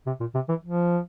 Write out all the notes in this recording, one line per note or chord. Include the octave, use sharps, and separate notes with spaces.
C3
A#2
C3
E3
F3